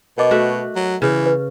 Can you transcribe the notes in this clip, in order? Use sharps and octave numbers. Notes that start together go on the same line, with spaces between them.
B2 A#4 D#5 D6
A3 F#4
F#3
C#3 E3
B4